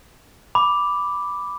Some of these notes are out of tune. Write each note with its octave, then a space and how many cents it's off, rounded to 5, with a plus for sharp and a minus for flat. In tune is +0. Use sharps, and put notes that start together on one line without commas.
B5 +0 D6 +0